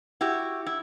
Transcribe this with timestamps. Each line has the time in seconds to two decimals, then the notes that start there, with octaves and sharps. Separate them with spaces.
0.21 E4 F#4 G4
0.66 E4